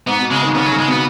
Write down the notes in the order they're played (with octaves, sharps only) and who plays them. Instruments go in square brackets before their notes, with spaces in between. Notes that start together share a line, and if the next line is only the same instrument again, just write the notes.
[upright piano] G#2 [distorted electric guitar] B3
[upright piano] B2
[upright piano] C#3 [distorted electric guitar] G#3
[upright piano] D#3
[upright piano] C#3 [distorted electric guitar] B3
[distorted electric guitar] F#3
[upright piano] C#3
[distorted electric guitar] G#3
[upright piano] B2 [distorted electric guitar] B3